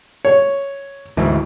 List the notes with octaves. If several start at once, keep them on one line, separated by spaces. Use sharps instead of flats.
C#5
D2 G#2 E3